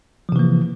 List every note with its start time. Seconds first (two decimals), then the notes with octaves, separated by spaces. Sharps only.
0.29 F3
0.32 C3
0.36 E3
0.39 A#3